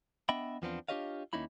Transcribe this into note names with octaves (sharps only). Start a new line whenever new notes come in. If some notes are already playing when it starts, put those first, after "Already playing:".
B3 D4 D#5 E5 G5 B5
E2 F3 B3 C4 D4 F4
D4 F4 G4 C#5 D#5 F5
D#2 A#3 C#4 D#4 E4 B5